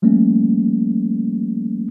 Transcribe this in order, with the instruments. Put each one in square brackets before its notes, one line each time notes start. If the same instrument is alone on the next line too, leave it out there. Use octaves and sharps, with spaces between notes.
[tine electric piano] F3 G3 A3 A#3 C#4